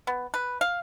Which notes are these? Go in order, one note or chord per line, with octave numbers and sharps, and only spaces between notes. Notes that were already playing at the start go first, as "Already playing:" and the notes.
B3
B4
F5